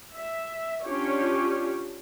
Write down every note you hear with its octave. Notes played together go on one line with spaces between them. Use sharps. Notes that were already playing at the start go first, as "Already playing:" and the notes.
E5
C#4 D4 F4 G4 C#5